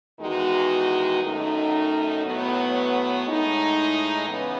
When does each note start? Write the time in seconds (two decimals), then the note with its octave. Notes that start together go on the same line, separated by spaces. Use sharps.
0.19 E2 D#3 G#3 D#4 F#4
1.21 F#2 D#3 A3 D#4
2.23 A2 F#3 B3
3.24 A2 G#3 D#4
4.27 C#3 E3 B3